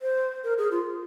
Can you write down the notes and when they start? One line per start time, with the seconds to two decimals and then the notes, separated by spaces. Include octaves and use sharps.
0.02 C5
0.44 A#4
0.58 G#4
0.71 F4